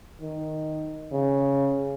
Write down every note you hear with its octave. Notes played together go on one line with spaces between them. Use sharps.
D#3
C#3